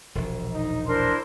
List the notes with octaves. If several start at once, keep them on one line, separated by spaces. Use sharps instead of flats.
E1 A#1
D#4
D4 E4 A#4 C5 C6